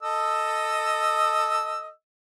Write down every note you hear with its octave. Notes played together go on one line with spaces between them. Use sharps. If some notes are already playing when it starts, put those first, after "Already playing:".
A4 D#5 E6